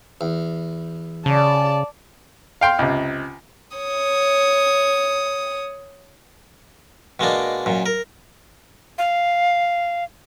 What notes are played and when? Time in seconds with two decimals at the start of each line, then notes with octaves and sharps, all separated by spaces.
0.21 E2
1.26 C#3 D5 A5
2.61 F5 G5 C6
2.79 C#2 C3
3.77 C#5 D#6
7.19 B2 G#3 A#3 D4
7.66 F#2 A#2
7.86 A#4
8.98 F5